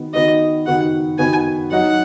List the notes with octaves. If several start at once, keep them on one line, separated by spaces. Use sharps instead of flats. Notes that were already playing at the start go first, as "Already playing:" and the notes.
Already playing: D#3 B3 D#4 F#4
D#3 B3 D#4 F#4 D#5
D#3 B3 D#4 F#4 F#5
D#3 B3 D#4 F#4 G#5
F#3 D#4 F#4 F#5